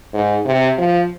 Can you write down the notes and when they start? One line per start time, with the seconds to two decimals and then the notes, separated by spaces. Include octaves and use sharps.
0.13 G#2
0.45 C3
0.78 F3